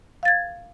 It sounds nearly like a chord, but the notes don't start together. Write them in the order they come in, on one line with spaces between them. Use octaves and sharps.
F5 A6 G#6